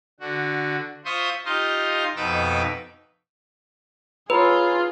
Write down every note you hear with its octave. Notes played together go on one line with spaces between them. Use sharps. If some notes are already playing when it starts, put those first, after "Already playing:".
D3 F#4
F4 C5 E5 C6 C#6 D#6
D#4 F4 G4 D#5 F5 C6
F2 B2 D#4 B4 D6 E6
F4 G#4 B4 C#5 A#5 B5